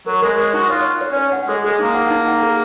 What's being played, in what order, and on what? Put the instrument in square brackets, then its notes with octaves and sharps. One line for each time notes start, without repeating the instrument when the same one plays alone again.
[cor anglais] F#3 [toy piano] A#4
[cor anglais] G#3 [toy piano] A#4
[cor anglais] G#3 [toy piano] C#5
[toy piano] D#4 [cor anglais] F#4
[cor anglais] F4 [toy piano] C#5
[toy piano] F#5
C#5
[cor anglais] C#4
[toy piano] C#5
F#5
[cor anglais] G#3 [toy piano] G#4
[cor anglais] G#3 [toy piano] G#4
[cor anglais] A#3 [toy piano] D#4
[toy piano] F#5
D#4
F#5
G#4